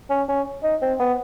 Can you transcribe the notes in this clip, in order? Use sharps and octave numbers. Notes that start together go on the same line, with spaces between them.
C#4
C#4
D#4
C4
B3